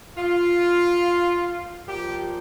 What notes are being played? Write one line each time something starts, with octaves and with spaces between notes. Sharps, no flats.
F4
A#2 F3 G4